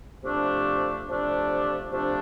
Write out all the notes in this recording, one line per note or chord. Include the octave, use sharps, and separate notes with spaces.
C3 F3 A3 D4
C3 F3 A3 D4
C3 F3 A3 D4